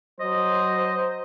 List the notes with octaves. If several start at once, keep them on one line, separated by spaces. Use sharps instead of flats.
F#3 C5 D#5